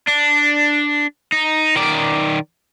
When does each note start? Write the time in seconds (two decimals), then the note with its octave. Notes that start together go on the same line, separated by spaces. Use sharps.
0.07 D4
1.32 D#4
1.76 D#3 D5